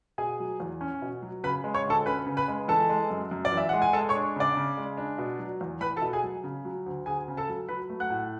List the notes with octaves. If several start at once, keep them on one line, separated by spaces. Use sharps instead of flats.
B2 G#4 G#5
F#3
E2
C#4
B2
F#3
C#3 B4 B5
G#3
C#5 C#6
D2 A4 A5
C#4 B4 B5
C#3
B4 B5
G#3
E3 A4 A5
G#3
F#2
F#2
D5
E3
E5
G#3 F#5
G#5
G#3 A4 A5
C#5 C#6
D4
C#3 D5 D6
C#3
G#3
D4
B2
F#3
E2
E2 B4 B5
A4 A5
B2
G#4 G#5
F#3
C#3
F#3
D2
D2 G#4 G#5
C#3
A4 A5
F#3
F#3 B4 B5
A3
F#5 F#6
A2